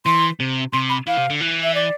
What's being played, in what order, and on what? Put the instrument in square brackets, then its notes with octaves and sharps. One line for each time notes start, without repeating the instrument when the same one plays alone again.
[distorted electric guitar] E3 [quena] C6
[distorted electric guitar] C3
[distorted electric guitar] C3 [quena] C6
[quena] B5
[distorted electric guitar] E3 [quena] F5
[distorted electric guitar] C3
D3
E3
[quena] E5
D5